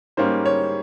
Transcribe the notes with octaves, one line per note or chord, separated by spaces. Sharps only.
G#2 G3 A#3 C#4 C5
C#5